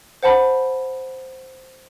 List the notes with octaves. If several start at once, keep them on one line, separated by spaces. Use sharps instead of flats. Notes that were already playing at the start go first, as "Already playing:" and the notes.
C5 F#5 A5 B5